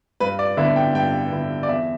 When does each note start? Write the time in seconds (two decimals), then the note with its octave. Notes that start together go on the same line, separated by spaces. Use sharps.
0.20 G2 B4
0.39 D5
0.57 D3 B3 E4 E5
0.76 G5
0.94 G2 G5
1.32 D3 B3 E4
1.63 D5
1.68 E2 E5